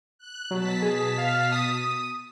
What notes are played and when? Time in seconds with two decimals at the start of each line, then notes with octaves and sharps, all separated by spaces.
0.18 F#6
0.51 B2 F#3 A5 B6
0.82 G#4
1.18 F5
1.52 D#6